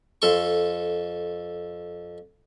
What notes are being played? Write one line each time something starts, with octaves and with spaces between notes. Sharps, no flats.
F2 A4 C6 C#6